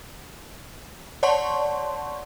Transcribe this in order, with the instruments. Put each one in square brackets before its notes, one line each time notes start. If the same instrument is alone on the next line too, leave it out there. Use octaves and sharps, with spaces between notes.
[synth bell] C#5 D5 F#5 A5 C6 C#6